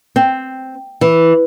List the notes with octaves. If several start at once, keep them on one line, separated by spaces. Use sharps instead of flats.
C4
E3